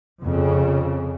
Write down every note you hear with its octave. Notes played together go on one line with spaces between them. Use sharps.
F2 C#3